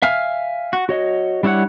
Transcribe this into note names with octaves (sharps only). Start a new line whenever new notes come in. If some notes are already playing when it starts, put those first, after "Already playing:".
E5 F5 G#5 F6
F#4
F#4 C#5 D#5
G3 D4 E4 C#5 F#5